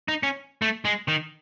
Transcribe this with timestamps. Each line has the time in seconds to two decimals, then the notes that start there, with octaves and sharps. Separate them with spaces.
0.08 D#4
0.23 C#4
0.62 A3
0.85 G#3
1.08 D#3